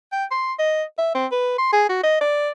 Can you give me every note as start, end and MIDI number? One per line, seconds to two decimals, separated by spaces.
0.12 0.25 79
0.31 0.53 84
0.59 0.83 75
0.98 1.11 76
1.15 1.26 60
1.31 1.54 71
1.58 1.72 84
1.73 1.85 68
1.89 2.01 66
2.03 2.16 75
2.21 2.50 74